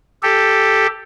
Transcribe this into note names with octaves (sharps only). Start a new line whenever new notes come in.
G4 A4